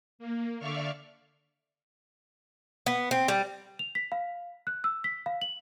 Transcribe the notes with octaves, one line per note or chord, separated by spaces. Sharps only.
A#3
D3 D5 E5 F5 C#6 F6
B3
C4
G3
F7
B6
F5
F#6
E6
B6
F5
F#7